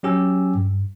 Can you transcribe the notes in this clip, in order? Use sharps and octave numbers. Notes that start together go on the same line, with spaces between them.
F#3 C#4 G4 G#5 E6
G2